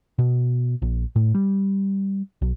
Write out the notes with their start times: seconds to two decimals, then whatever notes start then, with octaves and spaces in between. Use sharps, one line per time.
0.19 B2
0.82 A#1
1.16 A2
1.35 G3
2.42 B1